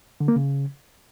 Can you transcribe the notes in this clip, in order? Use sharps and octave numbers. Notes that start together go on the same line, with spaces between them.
D3
A#3
C#3